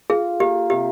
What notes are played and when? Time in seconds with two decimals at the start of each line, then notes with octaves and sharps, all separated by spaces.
0.10 F4 G#4
0.40 A#3 G4
0.70 C3 G4